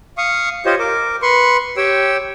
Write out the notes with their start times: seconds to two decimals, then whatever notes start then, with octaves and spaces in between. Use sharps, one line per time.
0.18 F5 C#6 D#6
0.66 F4 G4 C5 C#5 D#5
0.79 A#4 D6
1.22 B4 C6 C#6
1.77 G4 C#5 G5 E6